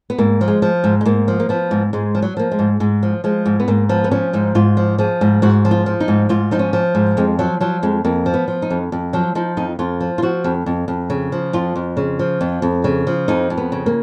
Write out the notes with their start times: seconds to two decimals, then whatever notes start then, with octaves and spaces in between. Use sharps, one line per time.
0.10 B3
0.18 G#2 A#3
0.41 F3
0.48 G#3
0.62 F3
0.84 G#2
1.01 G#3
1.06 G#2 A#3
1.28 F3
1.40 A#3
1.49 F3 B3
1.71 G#2
1.93 G#2 G#3
2.15 F3
2.22 F#3
2.37 F3 A#3
2.51 G#3
2.59 G#2
2.80 G#2 G#3
3.03 F3
3.24 F3 G#3
3.46 G#2
3.60 B3
3.68 G#2 A#3
3.89 F3 B3
4.04 B3
4.11 F3 C#4
4.33 G#2 D#4
4.55 G#2 F4
4.77 F3
4.98 F3 G#4
5.21 G#2
5.42 G#2 F#4
5.65 F3
5.71 F4
5.86 F3
6.00 D#4
6.08 G#2
6.29 G#2 F4
6.51 F3 D#4
6.59 C#4
6.73 F3
6.95 G#2
7.17 F2 G#3
7.39 F3 F#3
7.61 F3 F#3
7.83 F2 G#3
8.05 F2 A#3
8.26 F3
8.34 B3
8.48 F3
8.62 D#4
8.70 F2
8.92 F2
9.13 F3 F#3
9.35 F3 D#4
9.57 F2 D#4
9.79 F2 F4
10.01 F3
10.18 F4
10.22 F3 F#4
10.44 F2
10.66 F2
10.88 F2
11.10 C#3
11.32 F3
11.53 F2 F4
11.76 F2
11.97 C#3
12.19 F3
12.41 F2
12.62 F2
12.84 C#3
13.07 F3
13.28 F2 D#4
13.50 F2
13.57 B3
13.72 C#3
13.86 A#3